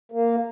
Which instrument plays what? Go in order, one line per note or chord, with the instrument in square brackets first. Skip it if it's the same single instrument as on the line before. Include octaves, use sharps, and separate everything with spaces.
[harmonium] A#3